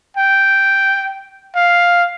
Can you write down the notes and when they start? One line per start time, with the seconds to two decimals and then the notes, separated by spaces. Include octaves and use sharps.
0.17 G5
1.55 F5